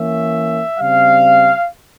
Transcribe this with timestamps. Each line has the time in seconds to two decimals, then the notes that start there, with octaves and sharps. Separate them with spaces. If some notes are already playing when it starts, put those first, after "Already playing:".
Already playing: E3 A#3 C#4 E5
0.79 C#3 G3 C4 F5